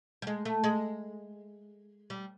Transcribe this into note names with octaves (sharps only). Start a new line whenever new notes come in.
G3
G#3
A3
G#3
G3